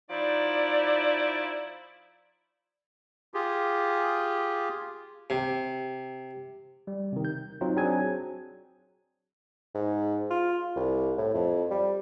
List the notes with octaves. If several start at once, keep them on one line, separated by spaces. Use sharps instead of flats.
F3 D#4 E4 D5
F4 G4 G#4
C3
G3
C3 D#3
G6
F#3 C4 D#4 F4
F#3 C4 D4 G#4 G#5 G#6
G#2
F4
C2
A2
F2
G3